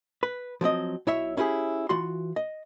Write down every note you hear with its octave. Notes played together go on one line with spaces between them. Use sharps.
B4
F3 F#3 C4 D#5
B1 E4 C#5 E5
C#4 E4 G4 G#4
E3 F4 F#4 C6
D#5